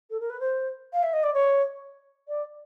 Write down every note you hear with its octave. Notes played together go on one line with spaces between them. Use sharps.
A4
A#4
B4
C5
F5
E5
D#5
D5
C#5
D5